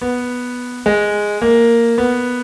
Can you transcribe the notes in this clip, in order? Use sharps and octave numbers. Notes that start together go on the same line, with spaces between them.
B3
G#3
A#3
B3